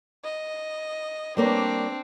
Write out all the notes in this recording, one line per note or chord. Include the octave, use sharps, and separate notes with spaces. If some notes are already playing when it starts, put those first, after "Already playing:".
D#5
G3 A#3 C4 D4 C#5